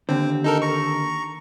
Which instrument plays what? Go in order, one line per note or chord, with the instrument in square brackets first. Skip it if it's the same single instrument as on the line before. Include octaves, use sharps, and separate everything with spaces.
[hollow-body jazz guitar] D#2 D3 [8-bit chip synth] C4
[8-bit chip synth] D#4 A4 A#4
A#5 C#6